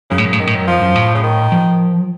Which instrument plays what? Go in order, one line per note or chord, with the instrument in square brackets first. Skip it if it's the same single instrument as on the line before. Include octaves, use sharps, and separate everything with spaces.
[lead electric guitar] F#2 [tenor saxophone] C#3
[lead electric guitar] A2
F#2
A2
[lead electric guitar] F#2 [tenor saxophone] D#3
[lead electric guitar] A2
F#2
[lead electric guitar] F2 [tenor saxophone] F3
[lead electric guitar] F#2
A2
[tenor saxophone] C#3
D#3
[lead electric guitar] F3